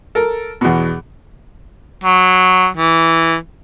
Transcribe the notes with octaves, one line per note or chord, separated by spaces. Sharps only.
A4 A#4
E2 B2
F#3
E3